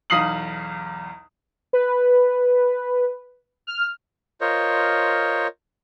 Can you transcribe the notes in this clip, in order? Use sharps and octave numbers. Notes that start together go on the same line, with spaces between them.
B1 E2 F5 D#6 C7 F#7
B4
F6
F4 A#4 C5 C#5 D#5